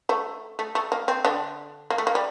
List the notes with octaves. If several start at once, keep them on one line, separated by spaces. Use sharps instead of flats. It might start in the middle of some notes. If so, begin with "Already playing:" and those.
A3
A3
A3
A#3
C4
D3 D4
A#3
A3
A#3
G3